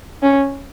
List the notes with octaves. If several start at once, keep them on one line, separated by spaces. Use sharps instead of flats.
C#4